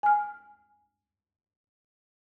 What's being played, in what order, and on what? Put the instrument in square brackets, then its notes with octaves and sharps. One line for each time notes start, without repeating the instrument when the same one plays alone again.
[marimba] G#5 F6